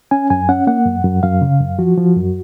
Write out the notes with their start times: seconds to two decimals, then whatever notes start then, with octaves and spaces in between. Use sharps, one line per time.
0.11 C#4 G#5
0.30 F#2 G#5
0.49 C#4 F#5
0.67 A#3 F#5
0.86 F#2
1.04 F#2
1.23 F#2 F5
1.42 C#3
1.60 F#2
1.79 F3 F#4
1.97 F3
2.16 F#2